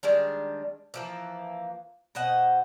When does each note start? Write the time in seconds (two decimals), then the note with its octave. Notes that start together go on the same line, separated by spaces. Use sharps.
0.03 D#3 G3 G#3 D4
0.94 E3 F3 A#3
2.15 B2 C5 D#5 F#5